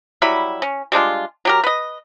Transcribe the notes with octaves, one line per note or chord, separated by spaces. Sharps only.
F#3 G3 E4 B5
C#4
G3 G#3 D4 F4
F#3 G4 A#4
B4 D#5